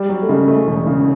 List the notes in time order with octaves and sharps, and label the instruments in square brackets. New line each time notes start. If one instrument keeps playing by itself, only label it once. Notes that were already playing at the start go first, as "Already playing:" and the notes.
Already playing: [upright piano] G3
[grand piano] F#3
[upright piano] A3
[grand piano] C#3 [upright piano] G#3
[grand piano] A3
E1
C#3